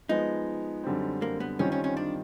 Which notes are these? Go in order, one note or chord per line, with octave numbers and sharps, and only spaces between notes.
F3 G#3 B3 D#4
F#2 D3 G3 C4
A#3
B3
D#3 G3 C4 C#4 F4
C#4
C#4
D4